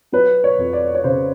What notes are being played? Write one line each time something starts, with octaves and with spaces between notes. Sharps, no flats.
F#3 B4
C#5
F2
D5
C#5
C#3 C5